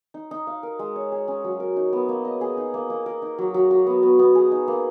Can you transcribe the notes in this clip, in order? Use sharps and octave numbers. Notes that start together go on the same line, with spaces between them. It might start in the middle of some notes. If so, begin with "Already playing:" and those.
D#4
D#4
F5
A#4
G#3
C#5
G#4
C#4
F#3
A#4
D#4
B3
A#3
D#5
G#4
D#4
A#3
A#3
A#4
D#4
F#3
F#3
F#4
B3
B3
B3
G#4
D#4
A#3